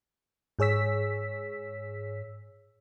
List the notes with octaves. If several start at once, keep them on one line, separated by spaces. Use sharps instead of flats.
G#2 G#4 C#5 E6 B6